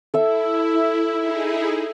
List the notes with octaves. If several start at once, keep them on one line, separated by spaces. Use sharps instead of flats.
E4 A4 E5
D#4 E4 G#4